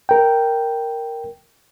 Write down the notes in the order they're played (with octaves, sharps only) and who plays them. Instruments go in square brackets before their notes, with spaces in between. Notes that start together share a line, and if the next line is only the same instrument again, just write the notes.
[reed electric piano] A#4 G5